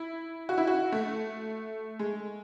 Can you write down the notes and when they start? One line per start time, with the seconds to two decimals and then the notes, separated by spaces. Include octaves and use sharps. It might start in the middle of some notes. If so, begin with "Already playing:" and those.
Already playing: E4
0.49 F#4
0.58 E4
0.67 F#4
0.92 A3
1.99 G#3